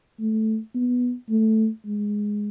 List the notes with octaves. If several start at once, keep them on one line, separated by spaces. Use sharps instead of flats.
A3
B3
A3
G#3